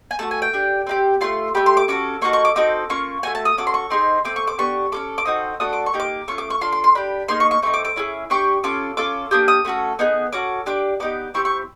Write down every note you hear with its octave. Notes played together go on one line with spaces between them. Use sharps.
G#5
A3 D4 F#4 A5
G#5
G5
D4 G4
C4 D#4 G4
A3 C4 F4 C6
A3 D4 G4 B5
C6
D6
C#4 F#4 A4 D6
A#3 D#4 F#4 A4 C#6
C#6
D6
C4 D#4 F#4 A4 D6
A#3 C#4 F4 C#6
A3 C#4 F#4 G#5
A5
D#6
C#4 F#4 A4 D6
C6
C#6
C4 D#4 G#4 C6
A3 C4 D6
C#6
D6
B3 D4 G4 C#6
C#4 F4 A4 D6
D6
C4 D#4 F#4 A4 D#6
A3 D4 F#4 A4 D#6
D6
C#6
A#3 D#4 G4
D6
A3 C#4 F4 C#6
D6
C#6
D4 F4 A4 C6
C6
C6
D4 G4 B5
A#3 D#4 G#4 C6
C#6
C#6
A3 C4 D#4 C#6
D6
D6
C#4 E4 G#4
D4 G4 C#6
C#4 F4 A4 D6
C#4 F4 A4 D6
A#3 D4 G4 D#6
D#6
A3 C#4 F#4 A4
B3 D#4 G#4
C#4 F#4 A4 D6
D4 G4 D6
B3 D#4 G4 D6
C4 E4 G4 C#6
C#6